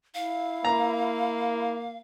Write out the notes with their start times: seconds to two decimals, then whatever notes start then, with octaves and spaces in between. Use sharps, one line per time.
0.15 E4 F5
0.65 A#3 A#5